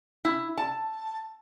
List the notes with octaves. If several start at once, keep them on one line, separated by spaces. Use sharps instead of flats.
E4
A5